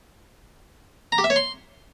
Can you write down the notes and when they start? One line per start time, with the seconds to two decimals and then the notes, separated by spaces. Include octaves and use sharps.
1.12 A#5
1.18 G4
1.24 E5
1.30 C#5
1.36 C6